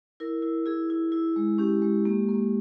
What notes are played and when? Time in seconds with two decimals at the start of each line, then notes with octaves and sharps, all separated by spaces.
0.20 E4 A#4
0.42 E4
0.66 E4 G#4
0.90 E4
1.12 E4
1.36 G#3
1.58 C#4 G4
1.82 G#3
2.05 A#3
2.29 A#3